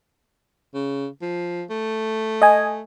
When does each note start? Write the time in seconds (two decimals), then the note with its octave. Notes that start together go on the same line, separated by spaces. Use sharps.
0.74 C#3
1.22 F3
1.70 A3
2.42 D#5 G#5